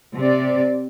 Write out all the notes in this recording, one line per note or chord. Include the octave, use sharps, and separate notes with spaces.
C3 D5